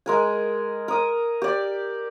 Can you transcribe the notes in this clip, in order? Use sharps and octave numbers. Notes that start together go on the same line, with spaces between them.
G#3 A#4 G#5
A#4 D#6
G4 D5